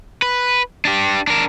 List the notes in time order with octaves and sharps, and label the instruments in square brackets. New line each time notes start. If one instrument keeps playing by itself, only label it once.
[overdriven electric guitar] B4
D4 G4
D4 A#4